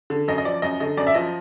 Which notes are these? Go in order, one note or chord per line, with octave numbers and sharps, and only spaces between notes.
D3
F#2 D#5
D#5
F3 D5
F#2 D#5
D3 D#5
F#2 D5
E5
F3 D#5